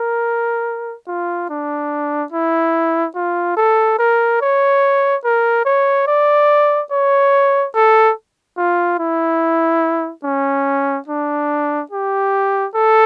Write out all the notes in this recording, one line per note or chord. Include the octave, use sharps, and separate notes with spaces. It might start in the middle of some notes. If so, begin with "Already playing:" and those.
Already playing: A#4
F4
D4
E4
F4
A4
A#4
C#5
A#4
C#5
D5
C#5
A4
F4
E4
C#4
D4
G4
A4